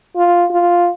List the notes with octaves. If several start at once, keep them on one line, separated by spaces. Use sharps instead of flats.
F4
F4